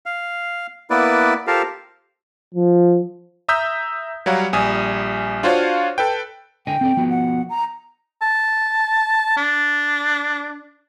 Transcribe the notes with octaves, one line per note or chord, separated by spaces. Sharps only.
F5
A#3 B3 E4 B4 D5
F4 G4 A4 A#4 C5 F5
F3
E5 A#5 D#6 E6 G6 B6
F#3 G3 C#5 F5 F#5 A#5
A#1 G3 G#5 D#6
D4 F4 F#4 C5 C#5 F5
A4 B4 G5
D3 D#5 G5 G#5
C4 A4 D5
F3 B3 F#4
F#5
A#5
A5
D4